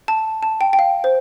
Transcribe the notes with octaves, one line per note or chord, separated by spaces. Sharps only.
A5
A5
G5
G5
F5
C5